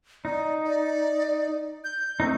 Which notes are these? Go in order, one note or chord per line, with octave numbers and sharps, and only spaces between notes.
D#4 D5
D5
G6
A3 C4 D#4